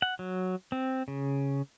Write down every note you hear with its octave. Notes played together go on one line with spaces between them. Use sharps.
F#5
F#3
C4
C#3